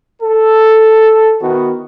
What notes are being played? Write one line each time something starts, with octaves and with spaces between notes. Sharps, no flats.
A4
D#3 B3 E4 F#4